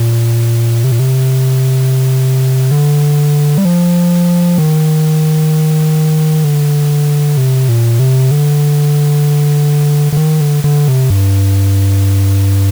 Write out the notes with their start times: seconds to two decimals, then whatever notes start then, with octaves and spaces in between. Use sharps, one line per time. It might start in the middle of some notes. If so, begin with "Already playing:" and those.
Already playing: A#2
0.84 C3
0.92 A#2
1.00 C3
2.71 D3
3.58 G3
3.65 F3
4.58 D#3
6.44 D3
7.37 C3
7.69 A#2
8.00 C3
8.31 D3
10.13 D3
10.17 D#3
10.41 D3
10.64 D3
10.88 C3
11.10 G2